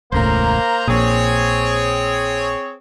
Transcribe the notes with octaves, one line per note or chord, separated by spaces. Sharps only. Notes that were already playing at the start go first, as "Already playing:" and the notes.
E1 C#2 A2 A#3 C5 A#5
A#1 A#2 C4 G#4 C#5